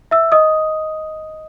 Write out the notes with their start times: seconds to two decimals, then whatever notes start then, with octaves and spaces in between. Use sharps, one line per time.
0.11 E5 E6
0.32 D#5 D#6